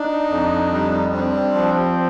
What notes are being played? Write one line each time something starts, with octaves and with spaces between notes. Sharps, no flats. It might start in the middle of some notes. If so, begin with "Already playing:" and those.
Already playing: D4 D#4
F2
G3
C4 D4
F3